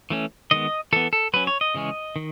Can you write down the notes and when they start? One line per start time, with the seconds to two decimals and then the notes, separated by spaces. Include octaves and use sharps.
0.10 E3 A3 C#4
0.51 D#3 G#3 B3 D#5
0.93 E3 B3 A4
1.13 A4
1.33 F#3 C#4 B4
1.47 C#5
1.61 D#5
1.75 C#3 E3 G#3 C#4
2.16 D#3